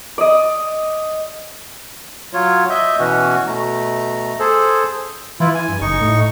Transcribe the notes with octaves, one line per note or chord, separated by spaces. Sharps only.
D5 D#5
F#3 F4 C#5
D#5 E5 G6
B2 E3 C#4 F#4
B2 A3 A#5
G#4 A4 C5
E3 E4 F4
G#5
G2
F#1 D#4 C#6
A2